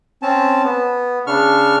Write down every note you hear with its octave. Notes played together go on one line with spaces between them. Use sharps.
C4 C#4 A5
B3
C#3 D4 C#6 F6